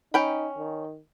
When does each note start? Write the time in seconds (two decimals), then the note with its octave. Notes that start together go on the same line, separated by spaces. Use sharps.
0.14 C#4 D#4 G5 B5
0.57 D#3